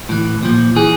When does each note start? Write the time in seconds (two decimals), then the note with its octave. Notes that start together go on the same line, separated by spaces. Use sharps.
0.09 A2 E3
0.43 A#2 F3
0.76 E3 G#4